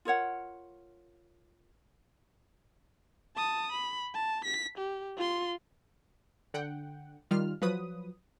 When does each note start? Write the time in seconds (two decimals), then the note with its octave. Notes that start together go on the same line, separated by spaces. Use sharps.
0.05 F4 A#4 C#5 F#5
3.36 A5 D#6
3.72 B5
4.14 A5
4.45 B6
4.78 G4
5.17 F4 C6
6.54 D3 F#5 G5
7.31 D#3 G3 F4 F6
7.62 F3 F#3 B4 D#6